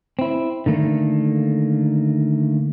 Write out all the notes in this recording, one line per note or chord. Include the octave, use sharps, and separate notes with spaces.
C4 E4
D3 D#3 A3 A#3